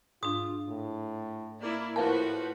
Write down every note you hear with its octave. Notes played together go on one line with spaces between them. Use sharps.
G#2 D4 F4 D#6
A2
A#3 E4 D5
A2 F3 E4 F#4 A#4 B4 F5 A5